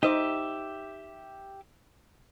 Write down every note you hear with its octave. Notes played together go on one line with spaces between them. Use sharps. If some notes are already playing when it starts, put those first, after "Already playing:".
D#4 G4 C5 D#5 E5 D6